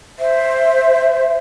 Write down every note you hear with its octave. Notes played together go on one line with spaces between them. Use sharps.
C5 E5